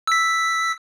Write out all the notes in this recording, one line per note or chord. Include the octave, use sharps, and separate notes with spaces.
E6 B6